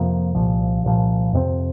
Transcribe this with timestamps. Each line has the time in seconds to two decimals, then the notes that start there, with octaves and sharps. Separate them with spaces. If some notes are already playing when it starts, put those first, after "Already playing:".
Already playing: F2 C3 F3 A#3
0.35 C2 A#2 F3
0.84 C2 A#2 F3
1.33 F2 C3 G#3 C4